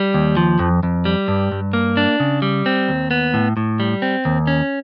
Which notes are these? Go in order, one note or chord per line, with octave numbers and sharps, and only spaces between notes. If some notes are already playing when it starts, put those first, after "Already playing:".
Already playing: G3
D#2
F3
F2
F2
G3
G2
G2
A#3
D4
C#3
G3
C4
D#2
B3
A2
A2
G3
C4
D#2
C#4